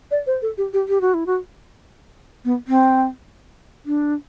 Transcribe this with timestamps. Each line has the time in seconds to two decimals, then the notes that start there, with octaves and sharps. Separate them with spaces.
0.11 D5
0.27 C5
0.42 A4
0.58 G4
0.73 G4
0.89 G4
1.01 F#4
1.14 E4
1.26 F#4
2.45 B3
2.68 C4
3.86 D4